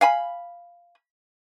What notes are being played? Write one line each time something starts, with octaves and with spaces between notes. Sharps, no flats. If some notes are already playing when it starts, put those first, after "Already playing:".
F5 G#5 B5